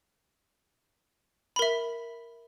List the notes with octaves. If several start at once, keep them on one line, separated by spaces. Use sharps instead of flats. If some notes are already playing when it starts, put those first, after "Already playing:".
A#4 E5 B5